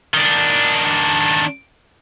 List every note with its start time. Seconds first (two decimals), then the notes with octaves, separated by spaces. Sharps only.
0.14 D#3 D4